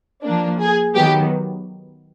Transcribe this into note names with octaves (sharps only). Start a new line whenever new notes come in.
F3 A#3 D4
G#4
D#3 F#3 B3 G4